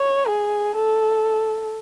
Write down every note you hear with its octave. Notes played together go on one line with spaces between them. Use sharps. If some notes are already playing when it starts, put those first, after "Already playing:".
Already playing: C#5
G#4
A4